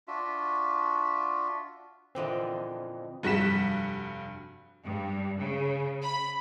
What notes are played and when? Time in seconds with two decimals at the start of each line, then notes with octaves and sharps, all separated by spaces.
0.08 D4 F4 F#4 E5
2.15 A#2 D3 E3 C4 F4 D#5
3.23 F1 G2 F#4 B6 E7
4.83 G2
5.40 C#3
6.02 B5